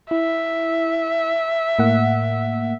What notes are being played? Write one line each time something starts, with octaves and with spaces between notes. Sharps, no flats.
E4 E5
A2 A#3 F#5